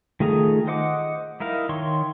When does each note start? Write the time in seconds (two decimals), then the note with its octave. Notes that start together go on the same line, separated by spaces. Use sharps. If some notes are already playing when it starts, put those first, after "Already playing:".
0.20 D#3 A3 F4 G#4 A#5
0.67 C5 D#5 F#5 D6
1.40 D#4 E4 A#4 F5
1.69 D#3 C#5 C6 C#6